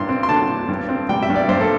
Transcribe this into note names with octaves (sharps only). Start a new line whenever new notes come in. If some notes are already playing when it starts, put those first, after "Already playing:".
Already playing: G2 E4 C6
C4
C6
D3 A5
E4
G2
C4
G3 G5
E5
G2
D5
G2 C5
A4